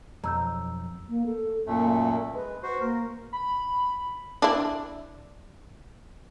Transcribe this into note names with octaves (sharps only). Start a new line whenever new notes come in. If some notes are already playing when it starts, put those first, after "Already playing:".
B1 F2 A#5 E6 G6
A#3
A4
F#2 A#2 A3 A#3
G#3 B4
F#4 C5
A#3 A#4
B5
D4 E4